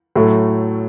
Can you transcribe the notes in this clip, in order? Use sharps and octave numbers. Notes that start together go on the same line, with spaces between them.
A2 F#3 A3